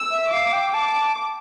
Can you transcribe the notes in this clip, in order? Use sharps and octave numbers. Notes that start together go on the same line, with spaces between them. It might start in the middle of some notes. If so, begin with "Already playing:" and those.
Already playing: E6
E5
F5 D6
G5
A5 D6